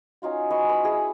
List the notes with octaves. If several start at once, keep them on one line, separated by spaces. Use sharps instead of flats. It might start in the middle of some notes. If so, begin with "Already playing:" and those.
C#4 D#4 F4 F#4
B4 D#5 G#5 C#6
B4 B5
E4 G#4